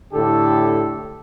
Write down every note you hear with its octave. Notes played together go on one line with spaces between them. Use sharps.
A2 D3 G4 A4